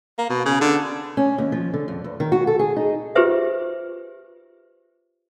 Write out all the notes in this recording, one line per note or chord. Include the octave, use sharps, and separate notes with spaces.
A#3
B2
C#3
D3
C#4
D#2
F3
D3
F2
E2
D#3
F#4
A4
G#4
D#4
F4 G4 G#4 B4 C5 E5